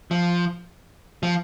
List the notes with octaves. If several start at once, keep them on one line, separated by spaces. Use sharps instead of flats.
F3
F3